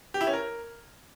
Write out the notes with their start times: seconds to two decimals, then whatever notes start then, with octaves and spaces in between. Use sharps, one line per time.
0.14 G4
0.21 E4
0.27 C#4
0.33 A#4